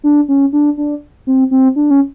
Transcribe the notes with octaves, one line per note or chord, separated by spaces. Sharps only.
D4
C#4
D4
D4
C4
C4
D4
C#4